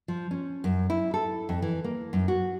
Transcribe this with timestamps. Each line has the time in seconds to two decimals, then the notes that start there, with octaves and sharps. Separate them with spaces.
0.08 F3
0.31 C#4
0.64 F#2
0.90 E4
1.14 A4
1.49 F2
1.62 E3
1.84 A#3
2.13 F#2
2.28 F#4